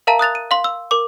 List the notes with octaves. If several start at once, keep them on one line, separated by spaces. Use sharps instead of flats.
A#4 E5 F5 A5 A#5 D#7
D#6 F#6 A6 F7
D#7
F5 C6
E6
A#4 D6